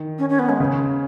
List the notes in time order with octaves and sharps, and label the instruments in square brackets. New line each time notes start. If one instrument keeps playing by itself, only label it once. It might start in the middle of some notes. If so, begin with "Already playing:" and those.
Already playing: [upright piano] D#3
[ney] C#4
C#4
B3
G#3
[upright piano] C#3